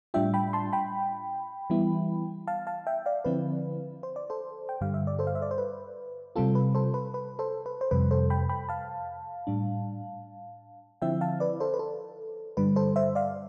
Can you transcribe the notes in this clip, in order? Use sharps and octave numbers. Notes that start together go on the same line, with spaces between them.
A2 G3 D4 F4 E5 G5
G5 B5
A5 C6
G5 B5
E3 G3 B3 E4
F5 A5
F5 A5
E5 G5
D5 F5
D3 F3 C4 E4 B4
C5
D5
A4 C5
G5
G2 D3 G3 F5
E5
D5
A4 C5
F5
E5
D5
C5
B4
C3 G3 C4 F4 A4
B4
A4 C5
B4
B4
A4 C5
B4
C5
F2 C3 G3 B4
A4 C5
G5 B5
G5 B5
F5 A5
A2 G3 D4
D3 F3 C4 E4 E5 G5
F5 A5
B4 D5
A4 C5
B4
A4
G2 D3 G3 B4
A4 C5
C5 E5
D5 F5